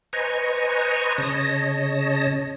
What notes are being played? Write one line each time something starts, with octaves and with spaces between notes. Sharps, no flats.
B4 C5 D#5 G#5 A#5 C#6
C#3 C#5 D#5 A5 A#6